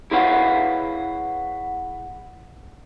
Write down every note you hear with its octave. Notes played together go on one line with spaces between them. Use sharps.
E4 G#4 B4 C#5 F5 F#5